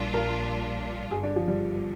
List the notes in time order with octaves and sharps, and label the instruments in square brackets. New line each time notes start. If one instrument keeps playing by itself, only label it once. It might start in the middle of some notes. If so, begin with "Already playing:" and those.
Already playing: [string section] A#1 A#2 G3 D4 F4
[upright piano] A#4
[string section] G1 G2 D3 [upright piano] G#4
[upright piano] D4
F3
G3